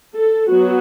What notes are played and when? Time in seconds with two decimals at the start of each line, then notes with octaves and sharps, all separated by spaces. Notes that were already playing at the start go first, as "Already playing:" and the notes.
0.15 A4
0.49 F#3 B3 F#4